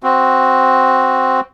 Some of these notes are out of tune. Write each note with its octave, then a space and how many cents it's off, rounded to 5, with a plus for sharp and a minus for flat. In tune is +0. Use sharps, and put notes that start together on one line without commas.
C4 +0 F#4 +0